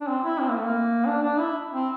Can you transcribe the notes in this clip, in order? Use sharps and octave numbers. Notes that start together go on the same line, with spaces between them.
D4
C4
E4
C4
A#3
A3
A#3
D4
D4
E4
C4